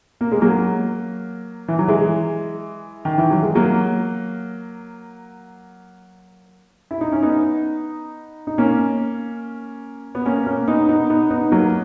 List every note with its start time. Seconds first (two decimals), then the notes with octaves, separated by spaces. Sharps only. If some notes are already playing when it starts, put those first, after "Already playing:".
0.21 A#3
0.32 G#3
0.42 F#3 A#3
1.68 E3
1.79 F#3
1.88 E3 G#3
3.05 D#3
3.18 E3
3.31 F#3
3.43 G#3
3.55 F#3 A#3
6.91 E4
7.01 D#4
7.12 C#4
7.23 B3 D#4
8.47 D#4
8.58 A#3 C#4
10.15 B3
10.26 A#3 C#4
10.46 A#3 C#4
10.68 B3 D#4
10.89 B3 D#4
11.10 B3 D#4
11.30 B3 D#4
11.51 F#3 A#3